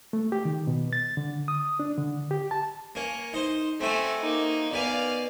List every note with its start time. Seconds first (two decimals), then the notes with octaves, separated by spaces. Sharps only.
0.13 A3
0.32 G4
0.45 D#3
0.67 B2
0.93 A6
1.17 D3
1.48 D#6
1.80 D4
1.97 D3
2.31 G4
2.51 A5
2.95 A#3 C#4
3.33 D#4 C5
3.81 A3 C4 F#4 G#5
4.21 A#3 D#4
4.72 B2 B4 D5 F5 G#5